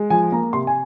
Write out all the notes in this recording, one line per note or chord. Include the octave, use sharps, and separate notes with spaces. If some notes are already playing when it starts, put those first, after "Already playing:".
Already playing: G#3
F3 G#5
A#3 A#5
C3 C6
G#5